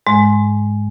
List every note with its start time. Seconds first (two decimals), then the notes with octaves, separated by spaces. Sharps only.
0.07 G#2 G#3